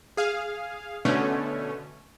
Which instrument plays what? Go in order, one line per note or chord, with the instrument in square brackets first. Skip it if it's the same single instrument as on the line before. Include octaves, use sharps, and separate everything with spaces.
[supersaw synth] G#4 F5
B2 D3 A3 C#4